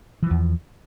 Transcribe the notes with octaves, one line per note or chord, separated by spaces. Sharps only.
E2 E3 F3